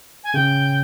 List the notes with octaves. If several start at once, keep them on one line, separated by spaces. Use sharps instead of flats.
G#5
C#3 G5